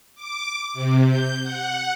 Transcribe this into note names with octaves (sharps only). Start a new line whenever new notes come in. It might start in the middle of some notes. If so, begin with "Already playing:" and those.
D6
C3
G6
F#5